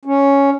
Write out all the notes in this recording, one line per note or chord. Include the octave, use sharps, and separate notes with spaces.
C#4